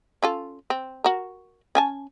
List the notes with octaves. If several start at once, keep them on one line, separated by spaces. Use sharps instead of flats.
C#4 F4 A4
C4
F#4 A#4
C#4 G#5 A5